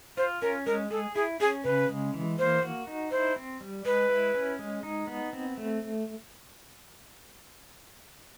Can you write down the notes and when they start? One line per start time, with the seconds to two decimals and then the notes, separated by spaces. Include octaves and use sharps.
0.17 F4 C5
0.42 C#4 A#4
0.66 G#3 A#4
0.91 G#4 A4
1.15 E4 G#4
1.40 C#4 G#4
1.64 C#3 B4
1.89 G#3
2.14 E3
2.39 A#3 C5
2.62 F#4
2.87 D#4
3.11 E4 C5
3.36 C4
3.61 G3
3.85 G#3 B4
4.09 E4
4.34 C#4
4.59 G#3
4.83 D#4
5.07 B3
5.33 C4
5.58 A3